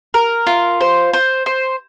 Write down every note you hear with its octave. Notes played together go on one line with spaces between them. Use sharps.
A#4
F4
C5
C5
C5